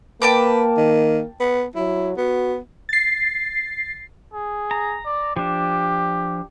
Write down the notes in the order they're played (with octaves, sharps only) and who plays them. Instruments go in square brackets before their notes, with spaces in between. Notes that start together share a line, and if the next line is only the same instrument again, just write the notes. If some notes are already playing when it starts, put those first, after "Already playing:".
[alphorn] A#3 [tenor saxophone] B4 [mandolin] G5 A5 D6
[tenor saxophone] D#3
B3
[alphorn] F#3 [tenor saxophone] E4
[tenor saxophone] B3 [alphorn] F#4
[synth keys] A6 C7
[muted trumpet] G#4
[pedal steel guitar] A#5
[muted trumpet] D5
[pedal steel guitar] F3 D4 [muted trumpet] G4